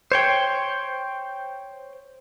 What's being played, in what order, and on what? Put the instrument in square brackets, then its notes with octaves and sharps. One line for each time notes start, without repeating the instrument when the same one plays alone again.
[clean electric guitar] C5 C#5 G5